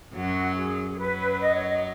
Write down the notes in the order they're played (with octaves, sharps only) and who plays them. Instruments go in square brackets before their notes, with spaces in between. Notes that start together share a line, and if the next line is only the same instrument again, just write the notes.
[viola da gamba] F#2 F#3 [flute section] F#4
[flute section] G#4
G#4
[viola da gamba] F#2 F#3 [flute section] B4
[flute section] D#5
C#5
D#5